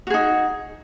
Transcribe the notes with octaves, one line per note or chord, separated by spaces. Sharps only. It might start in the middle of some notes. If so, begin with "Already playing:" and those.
D#4 F#4 G#4